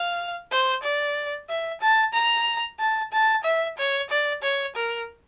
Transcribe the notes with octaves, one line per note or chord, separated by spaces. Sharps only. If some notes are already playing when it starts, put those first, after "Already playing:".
Already playing: F5
C5
D5
E5
A5
A#5
A5
A5
E5
C#5
D5
C#5
A#4